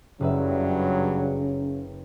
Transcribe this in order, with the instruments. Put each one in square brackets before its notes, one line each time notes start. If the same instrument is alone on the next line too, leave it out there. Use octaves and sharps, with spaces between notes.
[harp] F#1 B4 E5 [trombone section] G2 F#3 [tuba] C#3